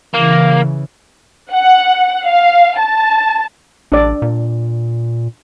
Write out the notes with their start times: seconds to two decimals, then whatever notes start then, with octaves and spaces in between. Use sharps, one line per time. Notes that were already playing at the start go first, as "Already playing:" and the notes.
0.14 C#3 E3 A#3
1.52 F#5
2.25 F5
2.79 A5
3.92 A1 D4 D5
4.22 A#2